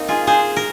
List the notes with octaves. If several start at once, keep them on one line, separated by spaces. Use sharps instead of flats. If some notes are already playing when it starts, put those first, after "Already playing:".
Already playing: A#3 C4 D#4
F4 G#4
G#4 C5
A#4